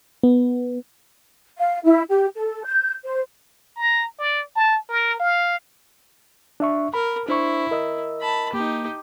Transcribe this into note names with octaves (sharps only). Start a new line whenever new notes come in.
B3
F5
E4
G4
A4
G6
C5
A#5
D5
A5
A#4
F5
D4 E5 C#6
A#4 B5
D4 E4 C5 C#6
A#4 D#5 E6
A5 B5
A#3 D#4 G4